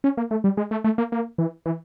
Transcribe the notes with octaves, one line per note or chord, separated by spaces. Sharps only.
C#4
A#3
A3
G3
G#3
A3
A3
A#3
A#3
E3
E3